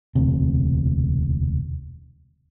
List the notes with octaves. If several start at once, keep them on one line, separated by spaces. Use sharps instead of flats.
E1 D2 C3